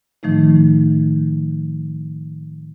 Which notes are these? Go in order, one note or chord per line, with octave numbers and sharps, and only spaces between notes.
A2 D#3 F3 A3 D#4